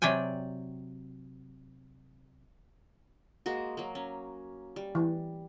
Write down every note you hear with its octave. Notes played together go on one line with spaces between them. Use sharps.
C3 F#3 D5 G5 G#5
G#3 A#3 F#4
F#3 A#3
C#4
G3
E3